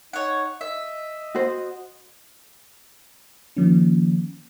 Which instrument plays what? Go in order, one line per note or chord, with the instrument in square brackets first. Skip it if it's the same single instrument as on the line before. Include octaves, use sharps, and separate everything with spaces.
[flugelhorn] D#4 [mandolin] C#5 F#5
[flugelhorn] D#5 [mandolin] E5
[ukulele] F#4 C5
[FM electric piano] D#3 F3 A#3 C#4